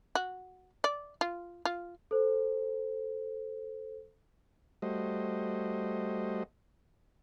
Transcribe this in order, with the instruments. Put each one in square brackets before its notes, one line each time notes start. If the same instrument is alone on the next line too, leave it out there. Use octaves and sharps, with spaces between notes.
[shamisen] F#4
D5
F4
F4
[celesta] A4 C5
[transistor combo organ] G3 A3 F#4 C5 D#5